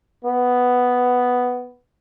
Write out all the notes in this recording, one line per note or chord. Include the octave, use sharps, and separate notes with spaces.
B3